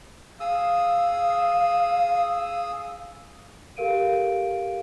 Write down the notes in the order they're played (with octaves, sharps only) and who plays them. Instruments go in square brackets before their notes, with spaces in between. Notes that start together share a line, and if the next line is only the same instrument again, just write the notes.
[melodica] G#4 D#6 E6 [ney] F5
[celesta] G4 A4 A#4 F5 D7 D#7